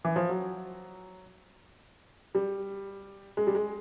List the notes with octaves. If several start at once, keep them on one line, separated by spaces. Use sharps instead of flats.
E3
F3
F#3
G3
G#3
G3
G#3